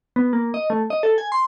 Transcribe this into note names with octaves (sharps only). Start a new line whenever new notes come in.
B3
A#3
D#5
A3
D#5
A4
G#5
C6